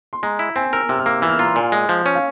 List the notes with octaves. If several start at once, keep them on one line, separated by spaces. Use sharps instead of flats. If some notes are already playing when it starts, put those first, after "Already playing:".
C6
G#3 A#5
E4
C4 G#5
A#4 E6
C3 E6
F6
A#3 E6
E3 E6
F6
E6
F4 A#5
C6
A#2 G#5
G#3
F3
C#4
F5